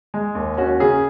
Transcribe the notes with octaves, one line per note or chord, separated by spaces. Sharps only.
G#3
D#2
C#4 F#4
C#3 G#4